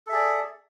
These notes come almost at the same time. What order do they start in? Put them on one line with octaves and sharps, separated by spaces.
A4 E5 G#4 D5